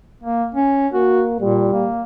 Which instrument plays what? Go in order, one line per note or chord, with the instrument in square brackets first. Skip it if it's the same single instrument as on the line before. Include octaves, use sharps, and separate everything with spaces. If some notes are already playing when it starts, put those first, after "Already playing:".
[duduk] A#3
C#4
[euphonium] A#3 [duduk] F#4
[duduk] A#2 [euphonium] G3
[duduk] A#3